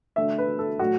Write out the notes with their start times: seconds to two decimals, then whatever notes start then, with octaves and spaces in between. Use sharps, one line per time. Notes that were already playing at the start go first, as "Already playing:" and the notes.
0.16 D3 A3 D4 E5
0.38 B4
0.59 A4
0.79 A2 F#3 A3 F#4